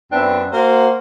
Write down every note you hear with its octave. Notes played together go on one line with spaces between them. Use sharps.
F#2 B3 C4 D4 E5
A#3 F#4 C5